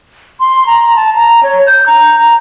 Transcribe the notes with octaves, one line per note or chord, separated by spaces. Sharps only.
C6
A#5
A5
A#5
C#5
G6
A#5
A#5